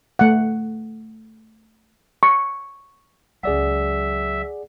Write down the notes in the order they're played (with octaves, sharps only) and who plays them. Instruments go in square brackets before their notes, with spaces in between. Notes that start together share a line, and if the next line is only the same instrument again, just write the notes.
[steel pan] A3 F#5
C#6
[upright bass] C#2 F#3 [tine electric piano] G#4 D5 F#5 [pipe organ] E5